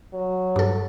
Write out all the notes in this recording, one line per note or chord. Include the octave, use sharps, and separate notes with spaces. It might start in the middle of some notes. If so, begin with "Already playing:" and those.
F#3
G2 A4